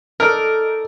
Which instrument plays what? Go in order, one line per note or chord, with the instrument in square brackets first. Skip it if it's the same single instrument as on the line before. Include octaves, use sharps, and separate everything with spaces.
[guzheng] D#4 A4 D5 [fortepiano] A#4